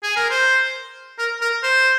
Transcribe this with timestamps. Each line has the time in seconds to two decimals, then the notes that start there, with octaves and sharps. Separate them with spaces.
0.03 G#4
0.16 A#4
0.30 C5
1.19 A#4
1.41 A#4
1.63 C5